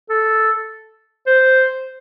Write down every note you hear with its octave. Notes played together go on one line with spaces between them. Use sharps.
A4
C5